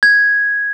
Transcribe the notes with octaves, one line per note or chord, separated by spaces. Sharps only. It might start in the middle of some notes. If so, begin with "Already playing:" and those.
G#6